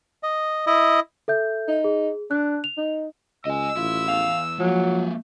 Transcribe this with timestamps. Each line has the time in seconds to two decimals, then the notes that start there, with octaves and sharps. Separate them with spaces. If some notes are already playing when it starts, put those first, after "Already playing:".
0.23 D#5
0.67 E4 D#5
1.28 A4 E5 G6
1.68 D#4
1.84 G#4
2.31 D4 F#6
2.64 F7
2.77 D#4
3.45 C#2 D#5 G#5 E6
3.76 A1 E4 F4
4.08 E2 F5
4.60 F3 F#3 G#3 A#3